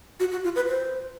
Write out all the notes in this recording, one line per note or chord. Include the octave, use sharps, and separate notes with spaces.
F#4
F#4
F4
B4
C5